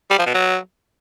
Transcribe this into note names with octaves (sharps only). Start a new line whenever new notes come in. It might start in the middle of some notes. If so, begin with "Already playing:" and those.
G3
F3
B2
F#3